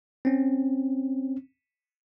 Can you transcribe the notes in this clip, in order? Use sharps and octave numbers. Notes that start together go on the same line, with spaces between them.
C4 C#4